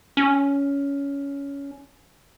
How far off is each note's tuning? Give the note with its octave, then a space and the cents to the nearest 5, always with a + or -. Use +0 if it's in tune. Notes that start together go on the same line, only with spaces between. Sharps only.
C#4 +15